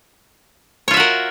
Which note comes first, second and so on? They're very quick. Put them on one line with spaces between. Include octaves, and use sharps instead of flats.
C#5 F4 E5 F#4 A#4